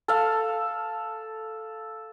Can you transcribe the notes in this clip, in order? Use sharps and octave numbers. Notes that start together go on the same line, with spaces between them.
A4 F5